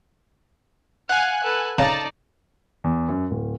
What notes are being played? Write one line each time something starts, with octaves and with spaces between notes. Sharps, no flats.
F5 F#5 G#5 F#6
A4 B4
C#3 D#4 D5 A5 A#5
E2
F#2
D1